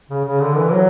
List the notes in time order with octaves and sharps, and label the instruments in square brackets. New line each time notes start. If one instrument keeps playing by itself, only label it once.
[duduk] C#3
C#3
D3
E3
F#3